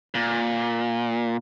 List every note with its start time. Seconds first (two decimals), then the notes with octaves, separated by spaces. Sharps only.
0.15 A#2